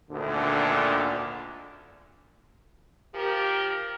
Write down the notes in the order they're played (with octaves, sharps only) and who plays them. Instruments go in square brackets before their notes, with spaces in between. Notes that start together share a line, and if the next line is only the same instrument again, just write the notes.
[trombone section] G#1 D2 A#2 D3
[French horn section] F3 G4 A#4